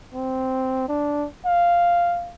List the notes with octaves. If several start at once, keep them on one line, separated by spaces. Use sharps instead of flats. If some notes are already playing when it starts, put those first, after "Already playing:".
C4
D4
F5